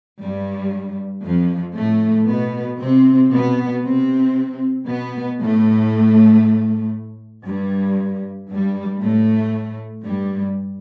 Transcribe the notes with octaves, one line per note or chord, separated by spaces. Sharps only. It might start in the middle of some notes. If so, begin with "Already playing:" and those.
G2 G3
F2 F3
A2 A3
B2 B3
C3 C4
B2 B3
C3 C4
B2 B3
A2 A3
G2 G3
G2 G3
A2 A3
G2 G3